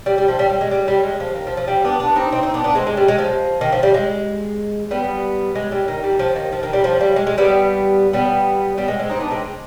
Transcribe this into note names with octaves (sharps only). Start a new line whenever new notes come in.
G3
G3
F3
G3
G3
G#3
G3
G3
G#3
F3
D#3
F3
F3
G3
B3 D4
B3 D4
C4 D#4
C4 D#4
C4 D#4
B3 D4
B3 D4
G#3 C4
G#3
G3
G#3
F3
D#3
F3
G3
G#3
G3 B3
G#3
G3
D#3
G3
F3
D#3
F3
D#3
G3
F3
G3
G#3
G#3
G3 B3
G3 B3
G3 B3
G#3
G#3 C4
C4 D#4
B3 D4
G#3 C4